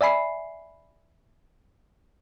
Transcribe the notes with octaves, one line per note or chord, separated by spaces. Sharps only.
D5 E5 G#5 B5 C7